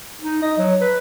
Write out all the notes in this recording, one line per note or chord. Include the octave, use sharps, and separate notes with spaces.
D#4
D#5
F#3
B4